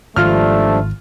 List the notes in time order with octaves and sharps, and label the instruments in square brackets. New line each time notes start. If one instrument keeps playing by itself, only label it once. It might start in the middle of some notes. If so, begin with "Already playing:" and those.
[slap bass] G#1 D#3 [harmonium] F3 G3 D4 [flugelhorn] A3 [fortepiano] F4 F6